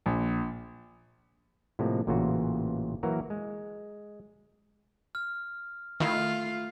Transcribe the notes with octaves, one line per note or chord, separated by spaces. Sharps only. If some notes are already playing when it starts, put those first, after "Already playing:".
A#1
A2 C3 F3 G#3 A#3
A1 A#2 C#3 E3 F4 F#4
E3 F#3 A#3 F#4 A#4
G#3
F6
D#3 A3 E4 F4